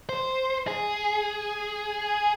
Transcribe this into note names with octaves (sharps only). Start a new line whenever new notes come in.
C5
G#4